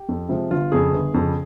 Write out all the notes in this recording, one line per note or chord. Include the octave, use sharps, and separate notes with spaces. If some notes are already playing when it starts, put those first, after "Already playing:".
Already playing: G4
F2
C3 F3 G#3 C4
G1 F4
F2 C#3 G#4
G1
F2 C#3